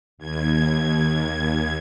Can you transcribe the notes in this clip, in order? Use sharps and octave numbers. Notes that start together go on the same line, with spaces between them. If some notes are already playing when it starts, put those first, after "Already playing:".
D#2 G#6